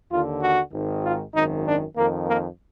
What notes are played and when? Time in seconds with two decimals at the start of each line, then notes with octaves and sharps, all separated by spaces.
0.11 D#2 D3 F4
0.42 F#4
0.73 G#1 G#2 D#3
1.04 F4
1.34 G#1 F#2 D#3 D#4
1.66 D4
1.96 F2 D#3 A#3
2.27 A#3